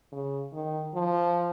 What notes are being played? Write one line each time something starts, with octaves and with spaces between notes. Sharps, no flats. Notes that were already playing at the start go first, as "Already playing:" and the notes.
C#3
D#3
F3